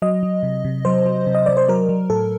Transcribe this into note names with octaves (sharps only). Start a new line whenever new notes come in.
F#3 D#5
F#3
C3
C3
F#3 C5
F#3
C3
D#5
C3 D5
C5
F#3 A#4
F#3
A2 A4